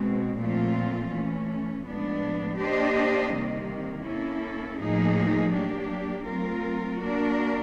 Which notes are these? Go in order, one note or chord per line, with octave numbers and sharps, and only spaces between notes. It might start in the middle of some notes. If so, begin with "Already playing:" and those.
Already playing: B2 G#3 C4
A#2 F3 A3 C4 F4
E3 A3 C#4
A2 F3 G#3 B3 D4
A#3 D4 G4 C5 D#5
C3 D#3 G3 A#3
A#3 C#4 E4 A4
A2 F3 A#3 D#4 G#4
F#3 A#3 D4 G4
F#3 A3 C4 F4 A#4
A#3 D4 F#4 A#4